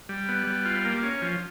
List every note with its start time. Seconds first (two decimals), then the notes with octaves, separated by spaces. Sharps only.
0.09 G3
0.29 B3
0.47 G3
0.65 F4
0.85 A#3
1.03 C#4
1.22 F3